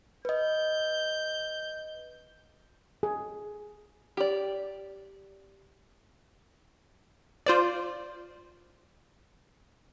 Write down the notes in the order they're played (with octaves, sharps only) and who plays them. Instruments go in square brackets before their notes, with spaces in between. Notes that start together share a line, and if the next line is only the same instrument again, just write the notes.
[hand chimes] B4 D#5 [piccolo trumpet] G6
[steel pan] G#4
[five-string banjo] G4 D5
[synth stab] F4 C5 D5